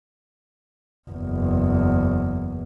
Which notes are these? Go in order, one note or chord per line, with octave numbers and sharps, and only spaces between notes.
F#1 E2